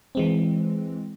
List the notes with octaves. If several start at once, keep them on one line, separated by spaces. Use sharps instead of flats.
E3 G#3 C4